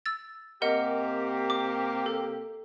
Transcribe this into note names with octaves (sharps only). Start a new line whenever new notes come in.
E6 A6
C3 A#3 G4 A#4 D#5 F#5
D6
A4